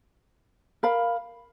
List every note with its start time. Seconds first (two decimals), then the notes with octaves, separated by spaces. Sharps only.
0.83 A#4 F5 B5